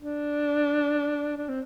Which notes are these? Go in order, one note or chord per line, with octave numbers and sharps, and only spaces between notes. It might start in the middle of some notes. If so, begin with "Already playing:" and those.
D4
D4
C4